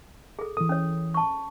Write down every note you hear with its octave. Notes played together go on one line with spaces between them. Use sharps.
G#4 A4
E3 A4 D#6
C#4 C#5
A5 C#6